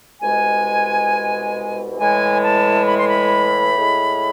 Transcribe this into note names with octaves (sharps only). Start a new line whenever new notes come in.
C2 B2 G#3 G#5
A2 E3 G#3 G#5
A5
B5
C6
B5
A2 G#3